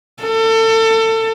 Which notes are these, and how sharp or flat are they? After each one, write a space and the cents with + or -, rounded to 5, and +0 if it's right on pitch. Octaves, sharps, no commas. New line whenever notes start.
A4 +30